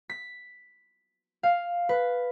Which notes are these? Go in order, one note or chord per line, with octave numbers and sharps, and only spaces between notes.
B6
F5
B4